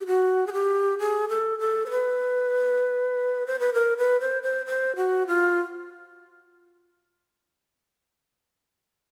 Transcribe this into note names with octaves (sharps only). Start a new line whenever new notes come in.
G4
F#4
G#4
G4
G#4
A4
A4
C5
B4
C5
B4
A#4
B4
C5
C5
C5
F#4
F4